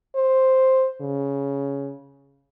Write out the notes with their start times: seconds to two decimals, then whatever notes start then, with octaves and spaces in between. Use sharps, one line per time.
0.16 C5
1.01 C#3